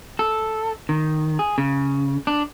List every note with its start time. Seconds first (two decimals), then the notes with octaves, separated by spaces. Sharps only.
0.19 A4
0.89 D#3
1.39 G#4
1.58 C#3
2.27 D4